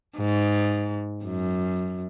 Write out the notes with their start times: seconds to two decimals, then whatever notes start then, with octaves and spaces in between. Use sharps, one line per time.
0.17 G#2
1.25 F#2